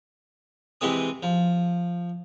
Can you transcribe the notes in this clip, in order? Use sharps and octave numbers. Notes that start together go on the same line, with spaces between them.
C3 E3 G#3 C4 D#6
F3